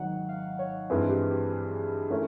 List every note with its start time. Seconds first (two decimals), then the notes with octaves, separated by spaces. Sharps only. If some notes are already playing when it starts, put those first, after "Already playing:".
Already playing: G#1 G#2 D#3 F#3 F#5
0.29 F5
0.59 C#5
0.90 G2 E3 G#3 C4 B4
1.09 G4
1.30 G4
1.50 G#4
2.10 E3 A3 C#4 E4 A#4